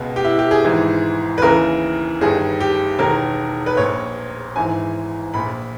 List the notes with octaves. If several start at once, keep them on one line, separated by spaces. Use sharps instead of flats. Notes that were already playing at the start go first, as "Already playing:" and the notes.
Already playing: C#2 B2
G4
E4
G4
G#4
G#1 G#2 E3
B4
D#2 C#3 E3 A#4
G1 G2 D#3 G#4
G4
E1 E2 D#3 A#4
B4
A#1 A#2 C#5
G#1 G#2 E3 G#5
A#1 A#2 B5